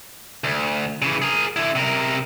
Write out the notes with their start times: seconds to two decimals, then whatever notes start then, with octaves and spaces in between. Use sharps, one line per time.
0.44 D2
1.02 C#3 E3
1.22 G#4 A#4
1.56 D3 E4
1.75 C3 A#4